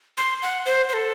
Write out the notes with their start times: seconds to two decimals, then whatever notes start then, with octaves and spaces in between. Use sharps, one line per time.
0.18 C6
0.42 F#5
0.66 C5
0.89 C5
0.93 A4